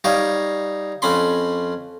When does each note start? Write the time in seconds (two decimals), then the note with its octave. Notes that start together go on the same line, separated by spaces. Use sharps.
0.04 G3 D#4 C#5 F5
1.02 F2 C#4 B5 C6